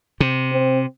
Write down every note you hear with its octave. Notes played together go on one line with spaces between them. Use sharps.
C3
C4